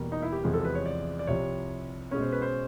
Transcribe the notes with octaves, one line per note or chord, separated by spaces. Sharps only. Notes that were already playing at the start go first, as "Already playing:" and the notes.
Already playing: E2 B2 G3 A#3
D#4
E4
G4
E2 C3 F3 G#3
A4
B4
C#5
D5
D5
C2 C3 F3 C#5
B2 G#3 C#4 C#5
C5
B4
C5